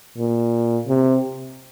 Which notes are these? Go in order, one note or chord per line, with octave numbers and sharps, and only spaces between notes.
A#2
C3